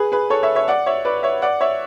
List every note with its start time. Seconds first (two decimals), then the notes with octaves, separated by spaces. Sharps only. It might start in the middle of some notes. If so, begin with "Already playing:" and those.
Already playing: G#4 B4
0.12 G#4 B4
0.30 A4 C#5
0.43 C#5 E5
0.55 C#5 E5
0.68 D5 F#5
0.86 C#5 E5
1.05 B4 D5
1.23 C#5 E5
1.42 D5 F#5
1.60 C#5 E5